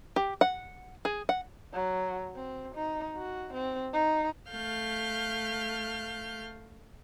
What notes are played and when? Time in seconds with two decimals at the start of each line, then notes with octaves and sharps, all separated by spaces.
0.16 G4
0.41 F#5
1.05 G#4
1.29 F#5
1.73 F#3
2.35 C4
2.75 D#4
3.17 F#4
3.53 C4
3.93 D#4
4.50 A3 F5 F6 G6